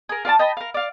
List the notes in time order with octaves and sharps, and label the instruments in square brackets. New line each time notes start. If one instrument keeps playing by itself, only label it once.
[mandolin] G#4 A#4
F4 D5 G#5 A5
D#5 G5 A5 B5
A#4 F5
D5 F5